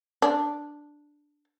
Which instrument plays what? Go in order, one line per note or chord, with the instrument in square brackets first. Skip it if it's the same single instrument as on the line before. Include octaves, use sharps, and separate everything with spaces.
[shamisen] D4